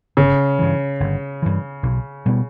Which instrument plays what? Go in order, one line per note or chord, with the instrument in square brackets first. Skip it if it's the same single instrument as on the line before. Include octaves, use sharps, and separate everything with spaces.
[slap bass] G1 [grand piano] C#3
[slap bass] G2 E3
G1
G2 E3
B1
B2 G3 B3